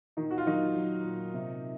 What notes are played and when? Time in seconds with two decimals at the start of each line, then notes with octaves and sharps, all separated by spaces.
0.17 A#2 D#3 D#4
0.31 F#4
0.38 F4
0.46 D#3 F#3 D#4
0.75 F#3
1.04 A#2
1.34 C3